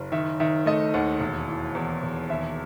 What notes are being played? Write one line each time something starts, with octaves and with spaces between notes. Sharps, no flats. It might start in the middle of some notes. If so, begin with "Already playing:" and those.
Already playing: F#1
D#3 E5
D#3 E5
A3 D#5
D#2 F#5
E1
E3
E2
E1
D#2 E5